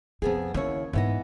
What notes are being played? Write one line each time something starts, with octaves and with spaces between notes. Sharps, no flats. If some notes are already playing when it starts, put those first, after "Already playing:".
F2 C3 B3 G#4
D#2 C#3 E4 C#5
G#2 E3 B3 E4 D#5